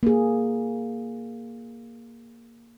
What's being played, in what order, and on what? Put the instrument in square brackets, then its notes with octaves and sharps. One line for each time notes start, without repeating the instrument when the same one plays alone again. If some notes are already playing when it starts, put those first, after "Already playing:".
[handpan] A#3 G#4